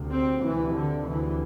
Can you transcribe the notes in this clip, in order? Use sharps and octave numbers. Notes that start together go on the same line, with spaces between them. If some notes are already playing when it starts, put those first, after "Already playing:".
Already playing: D2 C3
C4
D2 C3 E3
D3
D2 C3 E3